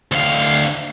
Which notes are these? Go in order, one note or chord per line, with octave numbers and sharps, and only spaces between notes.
D2 F5